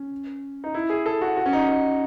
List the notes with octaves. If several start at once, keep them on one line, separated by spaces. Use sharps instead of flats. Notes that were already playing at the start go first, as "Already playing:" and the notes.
Already playing: C#4
D#4
E4
G#4
A4
F#4
F#4
C#4
D#4
D#4